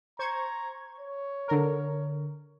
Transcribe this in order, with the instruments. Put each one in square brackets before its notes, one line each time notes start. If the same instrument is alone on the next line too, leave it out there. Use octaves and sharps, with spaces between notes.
[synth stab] C5 C#6 G#6 [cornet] A#5
[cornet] C#5
[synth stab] D3 A#4